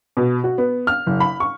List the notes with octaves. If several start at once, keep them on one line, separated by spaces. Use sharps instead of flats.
B2
F#4
B3
F6
F#1
B5
C#6